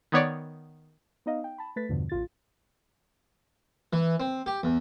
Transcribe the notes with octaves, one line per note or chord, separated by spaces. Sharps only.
D#3 B3 C#5 D5
B3 D#4 D#5 F5
G5
A5 B5
A3 B4 A6 B6
E2 G2 B2 D3 F3
A1 F4 A6
E3
C4
G4
E2